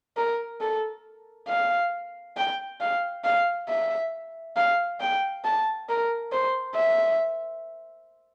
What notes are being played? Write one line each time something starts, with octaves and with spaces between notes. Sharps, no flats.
A#4
A4
F5
G5
F5
F5
E5
F5
G5
A5
A#4
C5
E5